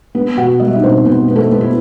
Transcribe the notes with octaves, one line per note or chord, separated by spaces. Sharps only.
B3
B2 F#4 F#5
G3 D#5
E5
D#4 D#5
B2 C4 C5
B2 B3 B4
B3
A3 A4
B3
E4